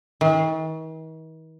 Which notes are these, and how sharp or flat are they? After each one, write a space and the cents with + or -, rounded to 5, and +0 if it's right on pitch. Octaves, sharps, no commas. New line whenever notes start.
D#3 +45